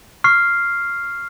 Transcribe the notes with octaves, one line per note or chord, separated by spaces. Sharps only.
C#6 F6 C7